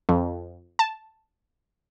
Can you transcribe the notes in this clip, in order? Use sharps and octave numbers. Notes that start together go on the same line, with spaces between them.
F2
A5